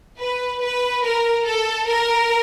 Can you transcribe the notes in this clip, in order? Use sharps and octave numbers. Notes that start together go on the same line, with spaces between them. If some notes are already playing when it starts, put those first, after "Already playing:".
B4
B4
A#4
A4
A#4